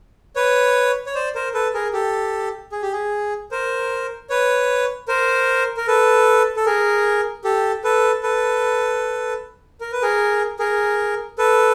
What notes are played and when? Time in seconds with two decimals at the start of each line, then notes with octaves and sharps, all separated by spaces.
0.36 B4 C#5
1.06 C#5
1.15 C5 D5
1.35 A#4 C5
1.54 A4 B4
1.74 G#4 A#4
1.93 G4 A4
2.72 G#4
2.82 G4
2.93 G#4
3.51 A#4 C5
4.30 B4 C#5
5.08 A#4 C5
5.77 A#4
5.87 A4 B4
6.56 A4
6.66 G#4 A#4
7.44 G4 A4
7.84 A4 B4
8.23 A4 B4
9.81 A#4
9.92 B4
10.02 G#4 A#4
10.59 G#4 A#4
11.38 A4 B4